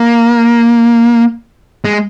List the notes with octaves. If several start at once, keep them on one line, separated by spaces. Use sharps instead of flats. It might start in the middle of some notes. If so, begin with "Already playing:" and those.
Already playing: A#3
G#3